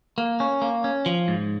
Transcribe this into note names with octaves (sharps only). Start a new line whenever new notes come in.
A#3
C#4
A#3
C#4
F3
G#2